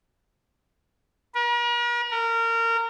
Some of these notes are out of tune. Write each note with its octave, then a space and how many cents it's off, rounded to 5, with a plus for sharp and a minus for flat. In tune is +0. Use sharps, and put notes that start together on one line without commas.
A#4 +45
A#4 -25